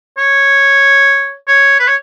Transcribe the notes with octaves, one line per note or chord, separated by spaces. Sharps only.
C#5
C#5
B4
C#5